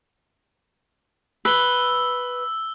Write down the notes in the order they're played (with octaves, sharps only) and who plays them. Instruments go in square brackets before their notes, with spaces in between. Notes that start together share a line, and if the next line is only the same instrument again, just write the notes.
[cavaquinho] B4 [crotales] E6 G7